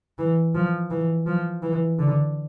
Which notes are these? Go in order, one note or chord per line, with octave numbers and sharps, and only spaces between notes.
E3
F3
E3
F3
E3
D3